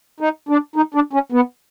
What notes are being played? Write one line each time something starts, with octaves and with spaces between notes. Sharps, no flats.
D#4
D4
D#4
D4
C#4
B3